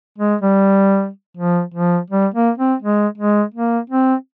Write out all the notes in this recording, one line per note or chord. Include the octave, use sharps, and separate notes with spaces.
G#3
G3
F3
F3
G3
A#3
C4
G#3
G#3
A#3
C4